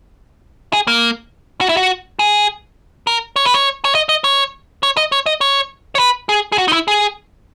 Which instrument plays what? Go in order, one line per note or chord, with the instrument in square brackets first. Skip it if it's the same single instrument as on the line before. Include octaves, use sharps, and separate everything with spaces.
[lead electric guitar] G#4
A#3
F#4
E4
F#4
G#4
A#4
C#5
B4
C#5
C#5
D#5
D#5
C#5
C#5
D#5
C#5
D#5
C#5
C#5
B4
G#4
G#4
F#4
D#4
E4
G#4